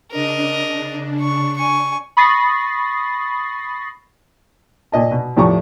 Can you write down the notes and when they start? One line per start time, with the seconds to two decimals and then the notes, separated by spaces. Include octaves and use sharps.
0.12 C#3 D4 A#4 D#5
1.21 C#6
1.57 G#5 C#6
2.17 B5 C#6 D#6 A6 A#6 C7
4.92 A#2 D#5 A5
5.11 B2
5.37 E2 A2 F3 G4 A#5 C#6